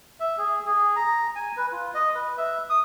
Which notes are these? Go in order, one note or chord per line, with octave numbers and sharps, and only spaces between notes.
E5
G#4
G#4
A#5
G#5
B4
F4
D#5
B4
E5
D#6